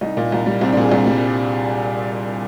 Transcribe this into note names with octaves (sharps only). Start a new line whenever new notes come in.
C2 D#4
A#2
C2
G3
C2 C4
D4
A#2 G#4
C2
G3